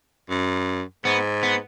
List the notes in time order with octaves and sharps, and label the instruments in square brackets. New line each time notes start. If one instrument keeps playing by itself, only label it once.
[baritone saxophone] F#2
[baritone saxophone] G#2 [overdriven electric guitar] B3
[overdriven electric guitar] B3